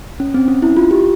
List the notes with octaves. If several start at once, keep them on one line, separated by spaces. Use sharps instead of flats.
C#4
C4
C#4
E4
F4
G4